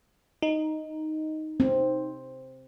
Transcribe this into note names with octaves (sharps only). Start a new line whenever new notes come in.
D#4
C4